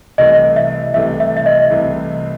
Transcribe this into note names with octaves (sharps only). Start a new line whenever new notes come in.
C2 C3 E3 A3 D#5
E5
C2 C3 E3 A3 E5
E5
E5
D#5
C2 C3 E3 A3